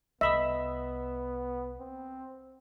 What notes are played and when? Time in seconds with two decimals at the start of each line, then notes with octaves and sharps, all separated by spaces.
0.21 C2 B3 D#5 E5 B5 D#6
1.79 C4